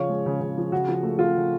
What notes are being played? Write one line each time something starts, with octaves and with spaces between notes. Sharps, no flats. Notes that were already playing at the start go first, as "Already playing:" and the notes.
Already playing: C#3 F3 C#5 F5
G#3
C#3
C#3
F3
C#3 F#4
F3
A3
C#3 F4
C#3